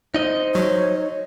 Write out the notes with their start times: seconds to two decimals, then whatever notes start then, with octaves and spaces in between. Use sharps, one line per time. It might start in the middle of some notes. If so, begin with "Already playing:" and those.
0.14 D#4 C5 D#5
0.55 F#3 C#5